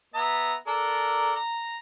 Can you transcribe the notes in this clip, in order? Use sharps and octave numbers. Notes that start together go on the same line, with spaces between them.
B3 E5 A#5
D4 A4 A#4
A#5